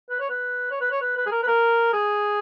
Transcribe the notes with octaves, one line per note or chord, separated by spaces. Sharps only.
B4
C#5
B4
C#5
B4
C#5
B4
B4
G#4
A#4
B4
A#4
G#4